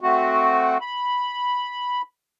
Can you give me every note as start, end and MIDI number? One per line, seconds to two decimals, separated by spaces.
0.01 0.78 57
0.01 0.78 60
0.01 0.78 66
0.81 2.02 83